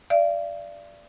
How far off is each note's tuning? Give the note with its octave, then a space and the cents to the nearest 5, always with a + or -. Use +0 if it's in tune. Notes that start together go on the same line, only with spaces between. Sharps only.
D5 +0 F5 -45